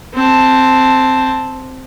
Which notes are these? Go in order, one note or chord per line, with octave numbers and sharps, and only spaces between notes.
C4 A5